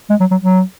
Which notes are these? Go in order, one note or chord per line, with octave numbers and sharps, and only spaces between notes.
G#3
F#3
F#3
F#3